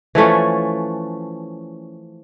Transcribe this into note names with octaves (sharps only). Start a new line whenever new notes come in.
E3 F3 A3 C#4